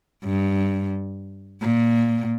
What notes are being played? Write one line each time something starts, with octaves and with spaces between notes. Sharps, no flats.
G2
A#2